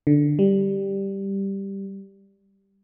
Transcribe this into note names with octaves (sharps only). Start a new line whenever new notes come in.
D3
G3